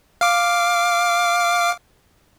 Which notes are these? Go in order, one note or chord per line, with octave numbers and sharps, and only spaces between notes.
F5 D6